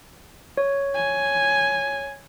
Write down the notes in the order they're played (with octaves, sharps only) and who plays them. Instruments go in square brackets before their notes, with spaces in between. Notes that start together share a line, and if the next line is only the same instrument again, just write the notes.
[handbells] C#5
[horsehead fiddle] G#5